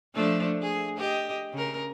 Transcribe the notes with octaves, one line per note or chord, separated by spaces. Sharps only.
F3 A3 D4
G#4
G4 D#5
C#3 A#4